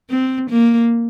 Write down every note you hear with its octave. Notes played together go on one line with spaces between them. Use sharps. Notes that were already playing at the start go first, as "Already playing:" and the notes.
C4
A#3